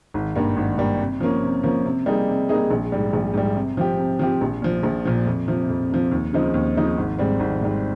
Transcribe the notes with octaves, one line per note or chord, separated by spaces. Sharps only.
G#1
G2 G3 A#3
G#1
G2 G3 A#3
C3
F3 A#3 C#4
C3
F3 A#3 C#4
C3
G3 A#3 D#4 G#4
C3
G3 A#3 D#4 G#4
A#1
G#2 G3
A#1
G#2 G3
C3
F3 C4 G4
C3
F3 C4 G4
A#1
A#2 F3
A#1
A#2 F3
F2
C3 F3
F2
C3 F3
D#2
C#3 F3 C4 D#4
D#2
C#3 F3 C4 D#4
G#1
G#2 G3 C4
G#1
G#2 G3 C4